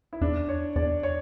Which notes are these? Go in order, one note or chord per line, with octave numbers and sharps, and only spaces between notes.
E4
E2 D4
C#5
E2 D5
C#5